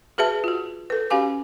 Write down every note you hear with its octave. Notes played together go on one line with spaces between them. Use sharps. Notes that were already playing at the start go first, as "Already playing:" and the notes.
F#4 G#4 B4 E5 A5
F4 F#4
A4 B4
C#4 F#4 G4 F5 G#5 D6